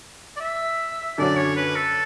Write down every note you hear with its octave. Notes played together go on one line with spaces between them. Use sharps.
D5
E5
F#2 D3 F#3 C#4 D5
C#5
B4
A4